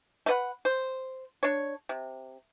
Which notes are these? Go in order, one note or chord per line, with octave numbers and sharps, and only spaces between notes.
A3 B4 F#5
C5
D4 C#5
C3